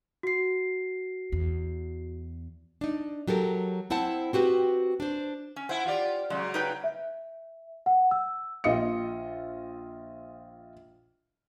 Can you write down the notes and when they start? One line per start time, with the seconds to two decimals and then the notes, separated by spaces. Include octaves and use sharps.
0.23 F#4 C7
1.32 E2
2.81 D4 D#4
3.27 F#3 G4 A4 A#4
3.90 C4 E4 C5 F#5 A5
4.33 C4 F#4 G4 B4
5.00 D4 C5
5.56 C#4
5.69 E4 C5 F#5
5.86 F4 G4 D5
6.30 C#3 F#3 G#3
6.54 D#4 B4 G5
6.84 E5
7.86 F#5
8.11 E6
8.64 A#1 F4 D#5 D#6 C#7